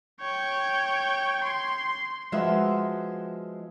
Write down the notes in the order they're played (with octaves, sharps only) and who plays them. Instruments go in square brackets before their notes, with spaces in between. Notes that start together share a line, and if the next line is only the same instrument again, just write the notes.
[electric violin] C#5 G5
C6
[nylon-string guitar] F3 G#3 B3 F#4 E5